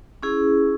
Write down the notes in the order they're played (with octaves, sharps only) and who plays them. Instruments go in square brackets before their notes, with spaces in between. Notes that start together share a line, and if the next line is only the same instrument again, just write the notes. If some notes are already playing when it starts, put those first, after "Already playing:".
[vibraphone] C#4 E4 G#4